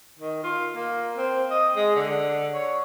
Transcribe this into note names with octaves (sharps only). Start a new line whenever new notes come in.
D#3
F4
A#3
C4
D#5
G#3
D3
C#5